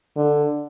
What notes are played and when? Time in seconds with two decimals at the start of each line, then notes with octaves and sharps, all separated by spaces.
0.17 D3